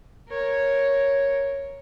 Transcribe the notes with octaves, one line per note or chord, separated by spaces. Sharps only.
A#4 C#5